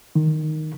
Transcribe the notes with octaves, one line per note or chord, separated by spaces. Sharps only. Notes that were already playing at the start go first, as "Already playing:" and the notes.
D#3